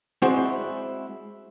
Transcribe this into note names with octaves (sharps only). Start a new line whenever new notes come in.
G#3 C4 E4 F#4 C5 D5